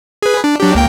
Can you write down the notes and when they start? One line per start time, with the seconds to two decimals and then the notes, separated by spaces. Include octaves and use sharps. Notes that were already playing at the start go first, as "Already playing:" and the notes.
0.22 G#4 B4
0.44 D4
0.60 F#3 D4 G4
0.75 C#2 A#3 G5